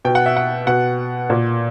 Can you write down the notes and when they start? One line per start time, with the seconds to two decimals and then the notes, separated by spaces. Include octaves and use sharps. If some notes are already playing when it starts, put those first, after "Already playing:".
0.05 B2 G5
0.15 F#5
0.26 E5
0.36 F#5
0.67 B2 F#5
1.30 A#2